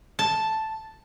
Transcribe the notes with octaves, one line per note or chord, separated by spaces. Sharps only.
A5